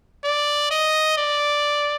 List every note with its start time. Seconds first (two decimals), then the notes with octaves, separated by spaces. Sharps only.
0.24 D5
0.71 D#5
1.18 D5